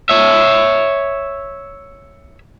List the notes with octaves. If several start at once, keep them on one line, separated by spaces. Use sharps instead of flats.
C#5 E5